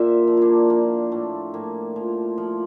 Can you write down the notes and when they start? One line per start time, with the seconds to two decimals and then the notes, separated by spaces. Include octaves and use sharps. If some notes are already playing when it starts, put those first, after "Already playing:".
Already playing: A#2 C5 D5 E5
0.27 F3
0.37 A#3 D4 E4
0.70 F3 A#3
1.12 A2 A3
1.54 A2 A#3
1.96 F3
2.38 F3